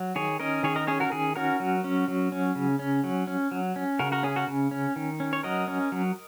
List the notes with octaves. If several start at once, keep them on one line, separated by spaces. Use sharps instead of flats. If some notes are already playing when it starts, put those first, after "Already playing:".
Already playing: F#3
D#3 G#4 C#5
C#4 A#4 D#5
D#3 G#4 C#5
A#4 D#5
C#4 G#4 C#5
F#4 A#4
D#3 G#4
C#4 F#4 A#4
F#3
C#4
F#3
C#4
C#3
C#4
F#3
C#4
F#3
C#4
C#3 F#4 A#4
F#4 A#4
C#4 G#4
F#4 A#4
C#3
C#4
D#3
C#4
C#5
F#3 A#4 D#5
C#4
F#3